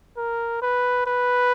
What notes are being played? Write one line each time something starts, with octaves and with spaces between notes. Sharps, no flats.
A#4
B4
B4